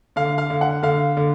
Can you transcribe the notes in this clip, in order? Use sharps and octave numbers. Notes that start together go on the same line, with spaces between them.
D3 F5
F5
D3
F#5
D3 F5
D3